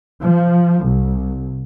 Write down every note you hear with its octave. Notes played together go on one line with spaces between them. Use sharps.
F3
C2